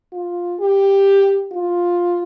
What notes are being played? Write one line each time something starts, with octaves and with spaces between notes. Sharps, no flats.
F4
G4
F4